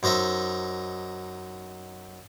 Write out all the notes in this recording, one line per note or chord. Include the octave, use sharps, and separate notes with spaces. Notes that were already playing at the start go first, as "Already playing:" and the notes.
F#2 D#4 C5 D#5 E5